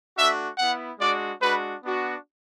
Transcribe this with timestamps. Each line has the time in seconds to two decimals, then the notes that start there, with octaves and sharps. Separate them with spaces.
0.17 A3 D4 F#4 E5
0.58 B3 E4 F#5
0.99 G#3 D4 F#4 D5
1.41 G#3 D4 F#4 B4
1.83 B3 D4 F#4